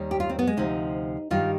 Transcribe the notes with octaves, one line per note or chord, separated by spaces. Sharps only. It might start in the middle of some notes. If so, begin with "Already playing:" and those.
Already playing: D#2 D#3 G3
G4
F4
C4
B3
G#3
D2 C3 F3 D#4
G2 D#3 G3 F4